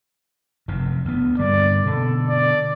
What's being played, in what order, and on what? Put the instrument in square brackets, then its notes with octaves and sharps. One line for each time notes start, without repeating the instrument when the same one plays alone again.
[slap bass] F1 F#2 C3
D2 B3
[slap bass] G2 D3 A#3 [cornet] D5
[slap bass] B2 D3 [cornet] A4
[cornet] D5